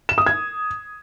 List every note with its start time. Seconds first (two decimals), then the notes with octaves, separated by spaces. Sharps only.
0.09 E7
0.18 D#6
0.26 G#6